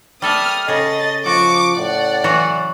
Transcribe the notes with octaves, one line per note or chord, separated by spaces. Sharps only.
G3 A4 E5 D#6 F6
C#3 G#4 A4 D#5 A6
F3 F#4 C#6 D6
A2 D5 F#5
E3 F#3 F#4